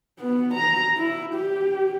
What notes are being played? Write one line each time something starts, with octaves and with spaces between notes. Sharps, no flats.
B3
A#5
E4
G4